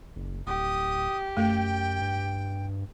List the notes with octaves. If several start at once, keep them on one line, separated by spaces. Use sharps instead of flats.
F#1
D1 G4 D#6
F#2 A3 G5
G2